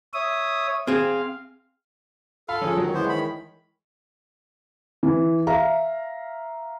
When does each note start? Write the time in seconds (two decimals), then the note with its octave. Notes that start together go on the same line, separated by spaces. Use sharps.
0.14 C#5 E5 D#6
0.87 C4 G#4 F5
2.49 A4 F5 B5
2.62 F3 C#4 G#4
2.77 D#3 F#3 C#5
2.94 E3 G#3 B3 C5
3.09 D#3 B5
5.03 E3
5.47 E5 F5 A#5